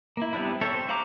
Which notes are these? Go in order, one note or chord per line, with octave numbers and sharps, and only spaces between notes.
A#3 E4
G3 B3 C4 D4 E4
C4 A4 C#5 E5
C5
F#4 C5 F5 A#5 D6